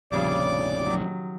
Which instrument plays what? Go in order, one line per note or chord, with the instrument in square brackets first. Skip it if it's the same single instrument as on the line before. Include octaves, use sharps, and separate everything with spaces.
[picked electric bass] F1 A#1 [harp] G2 C#3 F3 [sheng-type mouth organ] D5 D6
[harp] D#3 F#3